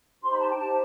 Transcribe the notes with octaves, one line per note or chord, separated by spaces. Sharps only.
D#4 G4 C5 C6
B5
A5
G5
D#4 G4 C5 A5